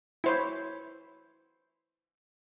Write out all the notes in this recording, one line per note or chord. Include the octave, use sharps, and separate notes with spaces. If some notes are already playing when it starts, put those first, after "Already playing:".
E4 C5 C#5